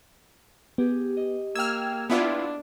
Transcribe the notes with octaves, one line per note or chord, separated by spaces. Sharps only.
B3 G4 G#4
D#5
A#3 G5 E6 F6 G#6
B3 D4 E4 F4 C6 F6